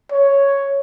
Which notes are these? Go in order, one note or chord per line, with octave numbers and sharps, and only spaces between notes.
C#5